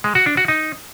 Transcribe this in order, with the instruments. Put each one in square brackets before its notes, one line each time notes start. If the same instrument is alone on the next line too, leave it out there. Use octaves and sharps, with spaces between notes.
[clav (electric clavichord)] G#3
F#4
D4
F#4
D#4